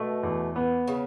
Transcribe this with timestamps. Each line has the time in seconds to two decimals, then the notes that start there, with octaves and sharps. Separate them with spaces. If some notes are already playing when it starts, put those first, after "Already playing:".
Already playing: B2 A3
0.23 E2
0.56 B3
0.87 C#3